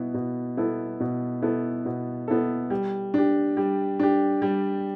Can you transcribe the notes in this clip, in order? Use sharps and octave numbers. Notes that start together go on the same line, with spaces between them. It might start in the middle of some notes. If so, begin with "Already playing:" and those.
Already playing: B2 B3 E4
B2
B3 E4 A4
B2
B3 E4 A4
B2
B3 E4 A4
G3
D4 G4
G3
D4 G4
G3